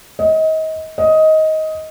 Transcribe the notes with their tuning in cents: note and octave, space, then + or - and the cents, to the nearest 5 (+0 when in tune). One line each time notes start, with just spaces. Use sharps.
D#5 +30
D#5 +15